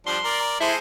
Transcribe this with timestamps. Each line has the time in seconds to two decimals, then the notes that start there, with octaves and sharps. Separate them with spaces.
0.07 F3 G3 D4 C6
0.24 A#4 D5
0.60 G#3 E4 A4 C5